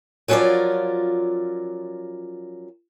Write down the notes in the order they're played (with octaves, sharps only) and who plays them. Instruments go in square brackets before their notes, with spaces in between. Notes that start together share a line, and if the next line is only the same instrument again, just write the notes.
[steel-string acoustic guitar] F3 F#3 C#4 F4 A#4 D5